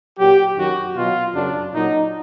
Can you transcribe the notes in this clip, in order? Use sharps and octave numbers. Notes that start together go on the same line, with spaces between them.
A#2 F#3 G4
F#2 D#3 F#3 F#4
B2 F#3 F4
F#2 C#3 F#3 D4
A#2 F#3 D#4